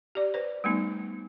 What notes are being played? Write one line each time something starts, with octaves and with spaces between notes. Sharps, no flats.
G4 D5
B4 C5
G3 A3 B3 D#4